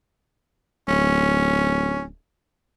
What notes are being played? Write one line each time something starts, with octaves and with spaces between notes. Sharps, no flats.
D1 C#4